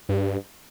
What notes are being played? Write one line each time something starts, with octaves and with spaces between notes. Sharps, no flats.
G2